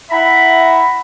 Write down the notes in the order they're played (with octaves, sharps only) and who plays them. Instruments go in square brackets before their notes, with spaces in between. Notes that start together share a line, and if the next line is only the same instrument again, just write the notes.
[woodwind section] E4 E5 F#5 A#5 B5